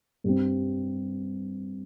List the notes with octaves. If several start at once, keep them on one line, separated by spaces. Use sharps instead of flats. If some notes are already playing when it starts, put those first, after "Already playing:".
G2 G3 C4